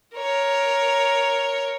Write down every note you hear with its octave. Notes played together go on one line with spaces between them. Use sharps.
A#4 C#5